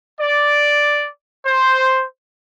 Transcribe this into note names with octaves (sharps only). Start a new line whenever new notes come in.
D5
C5